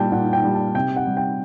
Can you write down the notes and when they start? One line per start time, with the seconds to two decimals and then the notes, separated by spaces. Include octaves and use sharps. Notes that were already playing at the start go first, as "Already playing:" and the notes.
Already playing: A#2 G3 G5 A5
0.12 A#2 F#5
0.33 G5
0.44 G3
0.54 A5
0.75 C3 G5
0.96 F#5
1.07 G3
1.17 G5